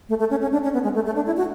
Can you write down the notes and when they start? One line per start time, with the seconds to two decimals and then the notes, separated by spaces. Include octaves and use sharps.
0.09 A3
0.19 A3
0.30 C#4
0.41 C#4
0.53 D4
0.63 C#4
0.73 B3
0.83 G#3
0.95 A3
1.06 A3
1.15 D4
1.26 E4
1.37 F#4